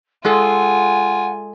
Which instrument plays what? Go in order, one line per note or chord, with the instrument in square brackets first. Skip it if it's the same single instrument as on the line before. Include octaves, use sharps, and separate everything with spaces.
[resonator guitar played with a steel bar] G#3 G#4 A4 [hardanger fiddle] F4 G#5 [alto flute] F#5